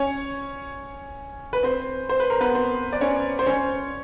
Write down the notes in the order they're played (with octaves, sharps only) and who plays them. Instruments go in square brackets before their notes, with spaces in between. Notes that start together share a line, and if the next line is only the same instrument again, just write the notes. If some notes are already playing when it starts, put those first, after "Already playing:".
Already playing: [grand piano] C#4 C#5
B4
C4 C5
C5
B4
A#4
B3 B4
C4 C5
D5
C#4 C#5
C5
C#4 C#5